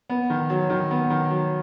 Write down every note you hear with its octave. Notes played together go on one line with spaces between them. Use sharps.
B3
D#3
F#3
D#3
B3
D#3
F#3